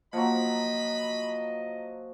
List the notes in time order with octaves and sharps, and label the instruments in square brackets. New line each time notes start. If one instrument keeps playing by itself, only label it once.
[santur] F3 F#3 [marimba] A#3 [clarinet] D#5 [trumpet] B5